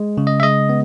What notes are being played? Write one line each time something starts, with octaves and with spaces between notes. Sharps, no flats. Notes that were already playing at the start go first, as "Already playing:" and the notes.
Already playing: G#3
C#3
D#5
E5
G#3 D#5
B3